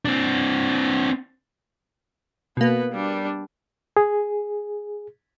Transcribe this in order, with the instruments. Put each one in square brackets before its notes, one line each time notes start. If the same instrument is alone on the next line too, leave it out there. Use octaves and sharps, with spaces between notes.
[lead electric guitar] C4 D4
[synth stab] B2 A#3 [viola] B3 B4
[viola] G3 D4
[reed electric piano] G#4